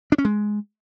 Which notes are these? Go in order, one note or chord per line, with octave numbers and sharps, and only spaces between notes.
D4
C#4
G#3